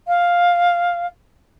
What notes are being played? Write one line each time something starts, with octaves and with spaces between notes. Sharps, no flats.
F5